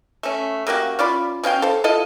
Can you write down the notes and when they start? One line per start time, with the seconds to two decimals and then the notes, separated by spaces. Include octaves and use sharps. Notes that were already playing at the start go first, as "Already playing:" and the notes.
0.23 A3 C#4
0.67 C#3 A#3 F#4 G4
0.99 C#4 F4 D5 B5
1.43 B2 C#4 F5 G5
1.62 A4 C5
1.84 E4 F4 A4 D#5